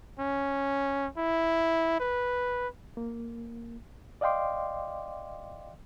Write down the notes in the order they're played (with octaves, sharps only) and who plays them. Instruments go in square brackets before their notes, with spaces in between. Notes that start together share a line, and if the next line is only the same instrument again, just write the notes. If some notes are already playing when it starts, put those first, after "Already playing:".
[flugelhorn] C#4
E4
B4
[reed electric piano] A#3
D5 D#5 F5 G5 C6 D6